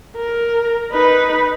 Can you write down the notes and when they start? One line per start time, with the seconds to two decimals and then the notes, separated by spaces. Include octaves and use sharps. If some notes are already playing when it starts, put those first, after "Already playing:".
0.17 A#4
0.92 D#4 B4